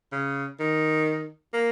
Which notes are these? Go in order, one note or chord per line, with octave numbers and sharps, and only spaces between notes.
C#3
D#3
A#3